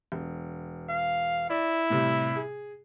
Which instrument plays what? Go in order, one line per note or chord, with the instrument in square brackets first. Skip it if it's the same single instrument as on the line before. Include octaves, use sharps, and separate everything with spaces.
[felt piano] E1
[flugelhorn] F5
[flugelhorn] E4 [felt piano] D5
[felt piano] A2 C3 G3
G#4